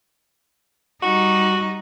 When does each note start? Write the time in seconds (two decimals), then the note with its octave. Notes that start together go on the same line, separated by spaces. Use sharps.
1.03 G3 D#4 F#4